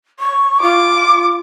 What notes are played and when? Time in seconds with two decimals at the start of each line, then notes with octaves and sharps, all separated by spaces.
0.19 C#6
0.62 F4 D6